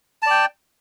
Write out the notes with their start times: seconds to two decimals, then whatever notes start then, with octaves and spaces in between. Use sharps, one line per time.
0.22 A5
0.26 D5
0.30 G5